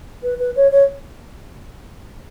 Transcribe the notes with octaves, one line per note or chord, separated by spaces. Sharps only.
B4
B4
C#5
C#5